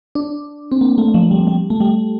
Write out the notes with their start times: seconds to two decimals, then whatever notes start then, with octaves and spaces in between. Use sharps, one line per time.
0.15 D4
0.72 C4
0.81 A#3
0.98 A3
1.14 F3
1.31 G3
1.47 G3
1.70 A3
1.80 G3